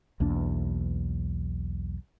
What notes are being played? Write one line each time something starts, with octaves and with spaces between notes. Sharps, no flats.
B1 E2 A#3 D4